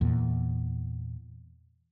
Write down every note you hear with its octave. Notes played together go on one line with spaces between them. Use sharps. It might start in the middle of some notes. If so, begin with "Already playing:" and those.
E2 A#2